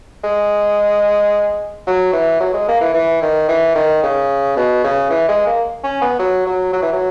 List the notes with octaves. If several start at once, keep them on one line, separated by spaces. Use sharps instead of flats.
G#3
F#3
E3
F#3
G#3
A#3
E3
E3
D#3
E3
D#3
C#3
B2
C#3
E3
G#3
A#3
C#4
B3
F#3
F#3
F#3
E3
F#3